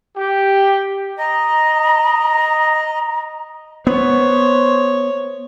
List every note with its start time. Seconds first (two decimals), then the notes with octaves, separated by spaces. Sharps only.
0.17 G4
1.19 D#5 A#5
3.87 B3 C5 C#5